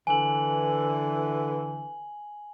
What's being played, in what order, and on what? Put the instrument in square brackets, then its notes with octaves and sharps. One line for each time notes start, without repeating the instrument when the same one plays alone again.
[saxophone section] D3 E3 [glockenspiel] G#5 F#7